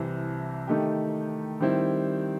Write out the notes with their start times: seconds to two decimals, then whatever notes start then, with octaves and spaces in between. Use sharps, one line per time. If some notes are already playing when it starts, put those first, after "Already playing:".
Already playing: C2 C3 E3
0.67 D#3 A3 D#4 G4
1.60 D#3 G3 C4 E4